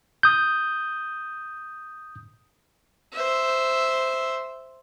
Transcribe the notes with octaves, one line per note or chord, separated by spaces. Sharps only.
D#6 G6
C5 E5